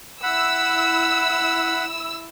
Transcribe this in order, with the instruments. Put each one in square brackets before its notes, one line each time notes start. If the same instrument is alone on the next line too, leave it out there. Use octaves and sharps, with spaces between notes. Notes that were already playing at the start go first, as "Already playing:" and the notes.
[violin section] E4 E6 [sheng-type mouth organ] F#5 B5